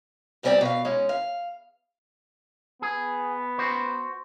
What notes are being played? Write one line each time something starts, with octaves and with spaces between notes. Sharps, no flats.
G#2 G3 B3 C4 D5 G5
B2 F5
G#3 C#4 D#4
F5
B3 G#4
F#4 C5